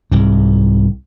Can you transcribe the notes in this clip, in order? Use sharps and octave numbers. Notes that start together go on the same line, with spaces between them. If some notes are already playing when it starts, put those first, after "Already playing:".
C2 G#2